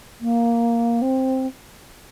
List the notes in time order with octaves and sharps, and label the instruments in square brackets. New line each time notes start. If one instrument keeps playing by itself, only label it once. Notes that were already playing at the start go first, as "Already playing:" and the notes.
[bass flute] A#3
C4